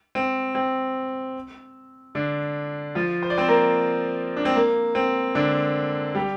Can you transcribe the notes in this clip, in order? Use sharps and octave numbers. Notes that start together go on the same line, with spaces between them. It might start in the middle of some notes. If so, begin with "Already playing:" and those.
C4
C4
D3 D4
F3 F4
C5
D5
C4 C5
A#3 A#4
D4
C4
A#3
C4
D3 D4
G3 G4